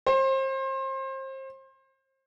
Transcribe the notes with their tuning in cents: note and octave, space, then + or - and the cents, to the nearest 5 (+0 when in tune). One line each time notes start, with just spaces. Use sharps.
C5 +30